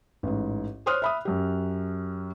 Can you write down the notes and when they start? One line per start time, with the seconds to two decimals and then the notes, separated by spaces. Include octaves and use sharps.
0.23 A1 G#2
0.86 C5 C#5 C6 D#6 F6 F#6
1.02 E5 B5 D#6
1.25 F#2 G4